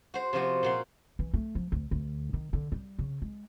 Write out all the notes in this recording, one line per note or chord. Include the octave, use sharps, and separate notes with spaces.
F#4 C5
C3 F3 F#4 C5
A#2 F#4 C6
E3
A3
F3
D2
D2
D#3
D3
G3
C#3
G#3